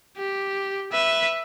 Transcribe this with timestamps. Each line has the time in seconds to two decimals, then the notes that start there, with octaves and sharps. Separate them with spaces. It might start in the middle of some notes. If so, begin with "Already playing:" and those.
0.17 G4
0.92 B4 E5